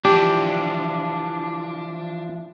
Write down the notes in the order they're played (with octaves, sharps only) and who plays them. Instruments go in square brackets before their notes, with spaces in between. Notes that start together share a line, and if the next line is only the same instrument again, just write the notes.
[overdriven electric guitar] E3 F3 [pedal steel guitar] D4 [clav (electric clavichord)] G4